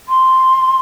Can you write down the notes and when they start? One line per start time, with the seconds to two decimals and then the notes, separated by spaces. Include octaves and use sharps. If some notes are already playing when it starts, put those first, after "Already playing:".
0.08 C6